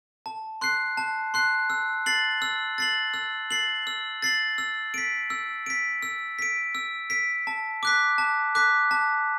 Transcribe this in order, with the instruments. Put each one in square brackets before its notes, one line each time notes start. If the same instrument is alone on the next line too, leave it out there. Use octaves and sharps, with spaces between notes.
[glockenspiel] A5
C6 F#6 C7
A5
C6 F#6 C7
E6
A6 C7 F#7
E6
A6 C7 F#7
E6
A6 C7 F#7
E6
A6 C7 F#7
E6
B6 D7
E6
B6 D7
E6
B6 D7
E6
B6 D7
A5
D6 F#6 B6
A5
D6 F#6 B6
A5